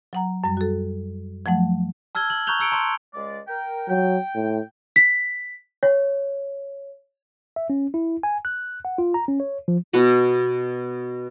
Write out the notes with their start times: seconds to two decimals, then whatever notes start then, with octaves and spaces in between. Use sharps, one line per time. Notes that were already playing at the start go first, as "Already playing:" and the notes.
0.13 F#3 F#5 A#5
0.44 F#2 G3
0.57 F#4 A4
1.46 F3 F#3 A3 F#5
2.15 A5 E6 F6 G#6 G7
2.30 F#7
2.47 A#5 C#6 F#6 G6 F7 G7
2.59 A#5 E6 C#7 D7 G7
2.72 A5 A#5 C6
3.14 C#2 G#3 D5
3.48 A#4 G5
3.89 F#3 G5
4.35 A2
4.96 B6
5.83 C#5
7.56 E5
7.70 C#4
7.94 E4
8.23 G#5
8.45 F#6
8.85 F#5
8.98 F4
9.14 A#5
9.28 C#4
9.40 C#5
9.68 F3
9.93 B2 F#4 B4